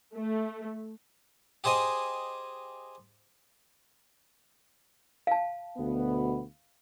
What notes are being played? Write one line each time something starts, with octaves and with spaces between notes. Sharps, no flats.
A3
G4 G#4 C5 D#5 G#5
F5 A5
D2 B2 B3